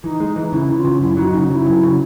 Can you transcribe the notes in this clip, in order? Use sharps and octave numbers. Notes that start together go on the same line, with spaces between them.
E3 D#4
G#3
E3
C#3 E4
C#3
F4
C#3
F#2 E4
F#3 D#4
C#3 D#4
C#3 E4
F#3
C#3